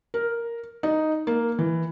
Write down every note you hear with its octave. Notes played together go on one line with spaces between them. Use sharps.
A#4
D#4
A#3
E3